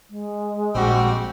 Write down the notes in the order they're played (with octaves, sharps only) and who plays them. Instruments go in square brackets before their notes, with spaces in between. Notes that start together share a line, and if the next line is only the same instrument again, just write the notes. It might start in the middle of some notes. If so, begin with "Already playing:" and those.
[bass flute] G#3
[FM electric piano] A#1 [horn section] G3 C4 F#4